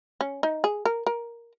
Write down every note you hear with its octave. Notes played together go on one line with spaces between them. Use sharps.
C#4
D#4
G#4
A#4
A#4